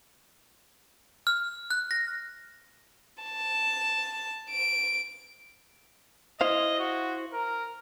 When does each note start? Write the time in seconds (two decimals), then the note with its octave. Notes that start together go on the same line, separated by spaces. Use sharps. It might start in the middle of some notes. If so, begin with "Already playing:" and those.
1.27 F6
1.71 F#6
1.91 A#6
3.23 A5
4.50 D7
6.41 E4 C5 D#5 F5
6.79 F#4
7.33 A#4